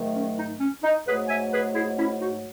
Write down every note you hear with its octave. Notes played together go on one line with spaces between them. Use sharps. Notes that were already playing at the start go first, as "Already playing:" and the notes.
Already playing: G#2 D#3 F#3 A3
C#4
D#4
C#4
D#4
G#2 F#3 A3 G#4 B4
E5 G#5
G#4 B4
E4 G#4
C#4 E4
D#4 F#4